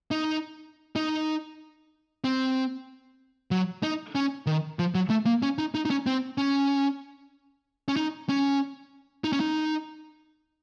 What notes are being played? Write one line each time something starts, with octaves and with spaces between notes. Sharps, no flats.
D#4
D#4
C4
F#3
D#4
C#4
D#3
F3
F#3
A3
A#3
C#4
D#4
D#4
D#4
C#4
C4
C#4
C#4
D#4
C#4
D#4
C#4
D#4